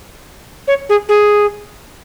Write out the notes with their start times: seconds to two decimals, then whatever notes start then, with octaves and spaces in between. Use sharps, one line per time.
0.68 C#5
0.89 G#4
1.09 G#4